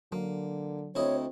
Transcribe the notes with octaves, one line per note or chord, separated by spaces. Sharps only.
D3 F#3 A#3
D2 C4 E4 C#5 D#5